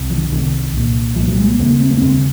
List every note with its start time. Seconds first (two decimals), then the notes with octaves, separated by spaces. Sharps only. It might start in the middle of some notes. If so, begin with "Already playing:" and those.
Already playing: C2 C3
0.10 F3
0.17 D#3
0.31 C2 C3 D#3
0.73 C2 A#2
1.16 C2 A#2 F3
1.27 F#3
1.38 G#3
1.48 A#3
1.59 D#2 C#3 A#3
1.70 A#3
1.80 C4
1.91 A#3
1.97 C#4
2.01 D#2 C#3 C4